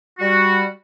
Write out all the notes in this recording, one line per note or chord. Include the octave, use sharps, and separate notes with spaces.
G3 F#4